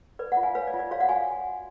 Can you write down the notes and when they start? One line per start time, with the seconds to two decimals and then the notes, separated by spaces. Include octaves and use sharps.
0.19 B4 D5
0.32 D5 F#5
0.37 F4
0.43 F5 G#5
0.55 B4 C#5 F5
0.67 D5
0.74 F4
0.79 D5
0.91 F#4 C#5 F5
1.00 D5 F#5
1.09 F#4 F5 G#5